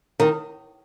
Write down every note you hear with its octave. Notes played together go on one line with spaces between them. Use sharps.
D#3